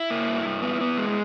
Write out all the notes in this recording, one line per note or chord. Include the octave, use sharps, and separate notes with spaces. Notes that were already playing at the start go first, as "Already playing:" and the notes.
Already playing: E4
A#3
G2
G2
B3
B3
G#3